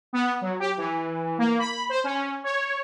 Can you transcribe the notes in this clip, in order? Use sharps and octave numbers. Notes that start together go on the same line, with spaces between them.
B3
F#3
G4
E3
A#3
B5
C5
C#4
C#5